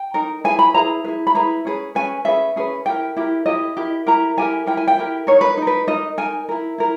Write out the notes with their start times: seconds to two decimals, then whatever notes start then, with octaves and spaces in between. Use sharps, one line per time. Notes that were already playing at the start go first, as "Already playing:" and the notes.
Already playing: G5
0.14 D#4 A#4
0.44 E4 G#4 B4 G#5
0.59 B5
0.74 E4 G#4 B4 A#5
1.04 E4 G#4 B4
1.27 B5
1.35 E4 G#4 B4 A#5
1.65 C#4 G#4 B4
1.95 C#4 G#4 B4 G#5
2.25 C#4 G#4 B4 E5
2.56 C#4 G#4 B4
2.85 E4 G4 A#4 G5
3.17 E4 G4 A#4
3.46 E4 G4 A#4 D#5
3.77 E4 G4 A#4
4.07 E4 G4 A#4 A#5
4.37 E4 G4 A#4 G#5
4.66 E4 G4 A#4 G5
4.77 G#5
4.88 G5
4.97 E4 G4 A#4
5.27 D#4 A#4 C#5
5.41 B4
5.57 D#4 A#4
5.67 B4
5.87 D#4 A#4 D#5
6.18 D#4 A#4 G#5
6.49 E4 A#4
6.78 E4 A#4